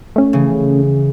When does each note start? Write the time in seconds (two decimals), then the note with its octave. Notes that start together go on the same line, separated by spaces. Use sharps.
0.16 A3 C#4
0.33 C#3 E3